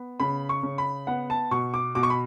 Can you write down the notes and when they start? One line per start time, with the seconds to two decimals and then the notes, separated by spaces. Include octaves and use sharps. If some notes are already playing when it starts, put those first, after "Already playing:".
Already playing: B3
0.20 C#3 B5
0.49 C#6
0.63 C#3
0.78 B5
1.07 B3 F#5
1.30 A5
1.51 B2 C#6
1.74 D6
1.95 B2 D6
2.03 C#6
2.10 B5